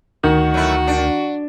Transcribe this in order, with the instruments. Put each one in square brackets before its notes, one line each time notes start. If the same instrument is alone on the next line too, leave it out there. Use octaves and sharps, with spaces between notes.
[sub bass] D2 [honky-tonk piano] D#3 [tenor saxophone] F#4
[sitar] F#3 A3 E4
D4